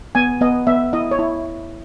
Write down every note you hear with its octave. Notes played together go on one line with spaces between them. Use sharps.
B3 G#5
B3 D#5
B3 E5
E4 D#5
C#5
E4